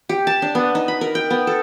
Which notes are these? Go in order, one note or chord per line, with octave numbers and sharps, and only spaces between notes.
G4
A5
D4
B3
D#4
B5
A#4
G5
B3
A4